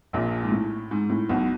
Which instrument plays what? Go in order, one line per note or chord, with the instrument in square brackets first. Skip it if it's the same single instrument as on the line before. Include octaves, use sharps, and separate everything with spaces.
[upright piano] A#1 A#2
G#2
A2
G#2
A2
B1 B2